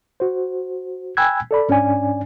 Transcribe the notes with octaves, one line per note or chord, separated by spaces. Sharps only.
F#4 C5
G5 G#5 B5 E6 F#6 G#6
A4 D5 B5
G#2 C#4 D4 D5 G#5